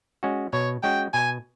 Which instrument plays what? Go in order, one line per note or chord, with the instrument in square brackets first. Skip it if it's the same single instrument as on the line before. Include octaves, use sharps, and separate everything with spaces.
[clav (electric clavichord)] G#3 C#4 F#4
[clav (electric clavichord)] B2 [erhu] C#5
[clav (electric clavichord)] G#3 C#4 F#4 [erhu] G5
[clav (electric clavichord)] B2 [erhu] G#5